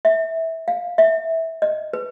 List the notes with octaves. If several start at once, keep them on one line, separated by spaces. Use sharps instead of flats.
E5
F5
E5
D#5
B4